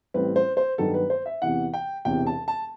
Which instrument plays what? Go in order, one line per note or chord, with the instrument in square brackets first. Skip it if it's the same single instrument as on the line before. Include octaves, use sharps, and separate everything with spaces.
[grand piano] A1 A2 G3 C4 B4
C5
C5
G2 D#3 F#3 B3 A4
B4
C5
E5
E2 C3 E3 F#5
G5
E1 E2 C3 E3 G5
A5
A5